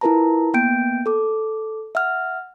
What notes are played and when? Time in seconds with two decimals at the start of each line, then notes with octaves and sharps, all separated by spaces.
0.01 E4 F4 A#4 B4 A5 A#5
0.54 A#3 B3 G5 G6 D7
1.06 A4 D6
1.95 E5 F#5 F6